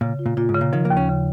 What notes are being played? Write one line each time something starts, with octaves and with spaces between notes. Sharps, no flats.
A#2 C#3
F4
A#2
A#2 F4
G#2
C#3
A#2
D#3 F3
A#3
D#2
C#4
C#3